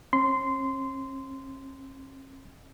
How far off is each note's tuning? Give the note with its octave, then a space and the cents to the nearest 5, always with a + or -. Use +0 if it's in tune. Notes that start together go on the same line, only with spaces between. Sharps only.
C#4 -45 C6 -15